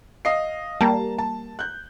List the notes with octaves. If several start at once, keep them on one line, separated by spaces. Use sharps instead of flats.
D#5 F5 C7
G3 A#3 A5 A#5
A5
F#6 G6